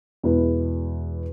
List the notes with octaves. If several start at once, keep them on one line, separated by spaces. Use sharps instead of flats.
E2 B2 G#3 E4 B4